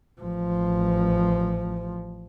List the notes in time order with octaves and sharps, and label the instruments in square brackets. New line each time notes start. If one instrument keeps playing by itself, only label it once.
[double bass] A1 F3